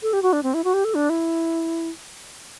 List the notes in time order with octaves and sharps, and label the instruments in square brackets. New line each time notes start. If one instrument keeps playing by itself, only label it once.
[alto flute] A4
G4
F#4
D4
C4
E4
F#4
G4
A4
D4
E4